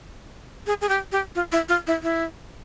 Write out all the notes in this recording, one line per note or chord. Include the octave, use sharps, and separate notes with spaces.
G#4
G#4
G4
G4
F4
E4
F4
E4
E4